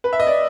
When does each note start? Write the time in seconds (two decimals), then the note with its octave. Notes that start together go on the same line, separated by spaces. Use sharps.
0.04 B4
0.13 E5
0.20 D#5
0.27 D5